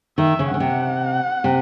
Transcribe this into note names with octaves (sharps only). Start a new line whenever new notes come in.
D#3 E5
C#3
C#3 F#5
C3
C3